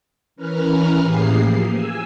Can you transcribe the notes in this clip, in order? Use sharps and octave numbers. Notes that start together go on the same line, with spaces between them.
E3 C#4 A#4 B4 F6
A2 E3 A#3 G4 G#4 C7
F3 A#3
G#5 E6